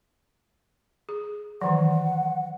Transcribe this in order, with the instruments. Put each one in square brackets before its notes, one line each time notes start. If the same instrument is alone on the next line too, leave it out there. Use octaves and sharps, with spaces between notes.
[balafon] G#4
[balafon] D#3 E3 F#3 [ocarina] F#5